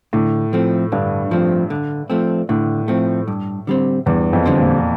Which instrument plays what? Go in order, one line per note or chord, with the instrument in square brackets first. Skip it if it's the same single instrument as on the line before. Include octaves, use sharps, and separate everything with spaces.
[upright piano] A2 [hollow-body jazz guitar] D3
[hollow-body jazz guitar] F3 A3 C4
[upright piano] G2 [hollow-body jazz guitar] D3
[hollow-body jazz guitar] F3 A3 C4
D3
F3 A3 C4
[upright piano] A2 [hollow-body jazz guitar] D3
[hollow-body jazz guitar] F3 A3 C4
G2
D3 G3 C4
[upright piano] E2 [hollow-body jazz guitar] G2
[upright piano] F2
[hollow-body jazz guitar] D3 G3 C4
[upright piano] A#2